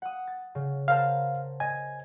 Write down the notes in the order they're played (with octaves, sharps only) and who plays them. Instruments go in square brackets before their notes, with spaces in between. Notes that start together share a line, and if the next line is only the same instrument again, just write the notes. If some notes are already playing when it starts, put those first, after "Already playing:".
[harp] F#5 D#6
A6
C#3
[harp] A#4 C5 A5 [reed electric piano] F5
[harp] D#5 [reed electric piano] G#5